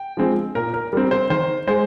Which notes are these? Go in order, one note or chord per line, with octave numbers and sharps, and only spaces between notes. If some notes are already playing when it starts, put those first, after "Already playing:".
Already playing: G5
F3 G#3 C4
A#2 A#4
A#4
G3 C4 A#4
C5
D#3 C5
G#3 C5